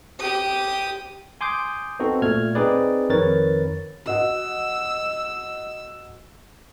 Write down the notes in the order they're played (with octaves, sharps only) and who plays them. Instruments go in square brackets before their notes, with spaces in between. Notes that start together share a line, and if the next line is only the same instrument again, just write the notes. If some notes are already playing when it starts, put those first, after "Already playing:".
[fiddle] G4 D#6
[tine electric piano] G#5 C6 D6 D#6 G6
B3 C4 D#4 F#4 A4
A#2 A3 F6 G#6
C4 D#4 G#4 B4 D5
F2 D#3 A#4 B4 C#5 A6
[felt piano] F#4 D#5 F#5 [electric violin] E6